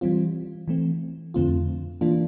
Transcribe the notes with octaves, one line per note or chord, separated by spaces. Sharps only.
E3 G3 C4 F4
E3 A3 C4
F2 D3 A3 C4 F4
E3 A#3 D4 F4